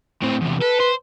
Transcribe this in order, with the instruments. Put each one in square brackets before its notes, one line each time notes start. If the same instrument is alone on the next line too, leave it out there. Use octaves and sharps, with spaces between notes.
[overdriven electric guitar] A2 C4
E2 C3
[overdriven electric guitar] A4 [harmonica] B4
[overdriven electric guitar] C5